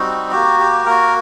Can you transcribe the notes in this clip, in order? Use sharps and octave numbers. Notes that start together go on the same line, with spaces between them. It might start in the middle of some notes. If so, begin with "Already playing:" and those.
Already playing: G3 C4 D#4 F#4
A#3 F#4 G4
G4
A#3 F#4 A#4